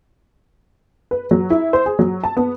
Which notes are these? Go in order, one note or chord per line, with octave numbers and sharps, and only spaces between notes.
B4
F#3
E4
C5
G#4
F#3
A5
B3